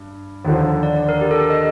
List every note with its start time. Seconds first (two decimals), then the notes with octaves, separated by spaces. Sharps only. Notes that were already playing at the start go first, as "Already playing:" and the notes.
Already playing: G2
0.45 D#2 D3 F3
0.83 D5
0.96 D5
1.09 A#4
1.21 G4
1.31 A4
1.41 A4
1.50 D#5